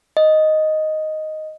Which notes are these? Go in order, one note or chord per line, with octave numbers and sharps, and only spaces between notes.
D#5